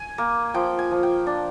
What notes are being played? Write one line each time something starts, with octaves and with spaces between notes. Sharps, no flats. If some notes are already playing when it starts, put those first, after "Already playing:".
Already playing: G#5
A#3
F3 G5
G#5
F3
G5
D4